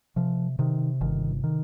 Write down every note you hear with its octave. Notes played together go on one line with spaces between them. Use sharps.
C3 F3
C3 D#3
G1 D#3
D#3